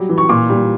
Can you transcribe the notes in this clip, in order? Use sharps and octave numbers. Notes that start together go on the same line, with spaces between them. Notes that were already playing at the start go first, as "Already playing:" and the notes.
Already playing: F#3 G3
E3
C#6
A#2 D6
G3